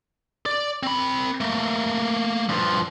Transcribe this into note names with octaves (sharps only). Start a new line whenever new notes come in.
D5
C4 B5
A3 A#3
G2 F3